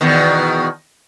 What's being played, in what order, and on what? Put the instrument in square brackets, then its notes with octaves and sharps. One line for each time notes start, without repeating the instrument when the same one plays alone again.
[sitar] E2 B2 D#3